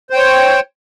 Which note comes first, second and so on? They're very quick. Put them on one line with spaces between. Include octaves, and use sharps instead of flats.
C5 G5 C#5